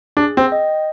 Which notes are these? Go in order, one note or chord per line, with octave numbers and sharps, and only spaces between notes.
D4 G#4
C4
D#5 G5